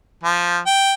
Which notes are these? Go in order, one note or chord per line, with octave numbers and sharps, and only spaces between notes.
F3
G5